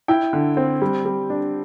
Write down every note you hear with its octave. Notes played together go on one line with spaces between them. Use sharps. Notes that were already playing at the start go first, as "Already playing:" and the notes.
E4 G5
D3
C4
G3
G3
D4